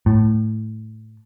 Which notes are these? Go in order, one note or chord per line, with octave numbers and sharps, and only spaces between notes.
A2